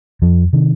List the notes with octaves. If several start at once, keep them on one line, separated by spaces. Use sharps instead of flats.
F2 F3
C3 D#3